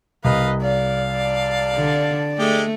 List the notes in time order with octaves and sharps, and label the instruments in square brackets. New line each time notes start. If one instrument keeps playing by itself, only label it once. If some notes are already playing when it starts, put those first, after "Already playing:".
[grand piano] C2 [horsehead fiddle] B4 D#5 [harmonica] F5
[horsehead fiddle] D5 [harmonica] F5
[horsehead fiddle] D5 A5
[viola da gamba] D3
[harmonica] G#3 G4 [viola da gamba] A3